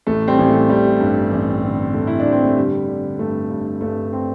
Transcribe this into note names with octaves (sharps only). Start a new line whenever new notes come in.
A1 A3
G3 C4
A1
A3
A1 G3
G2
A1
D3
A1 A3
E4
D4
G2
C4
A3
D3 G3
D3
G2 A3
G2
G2 A3
C4